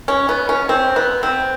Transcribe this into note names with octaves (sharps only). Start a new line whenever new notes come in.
C#4
B3
C#4
C4
B3
C4